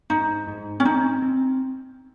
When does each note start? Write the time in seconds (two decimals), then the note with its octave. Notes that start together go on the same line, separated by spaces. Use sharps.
0.10 G#2 D#4
0.48 G#2
0.80 C#4
0.85 C4 D#4
1.22 C4